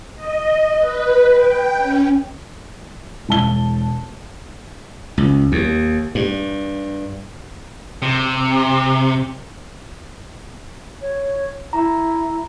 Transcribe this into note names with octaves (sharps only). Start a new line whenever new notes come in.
D#5
B4
G5
C#4
E1 A5 G7
C#2
D#2
G2
C3
C#5
E4 A#5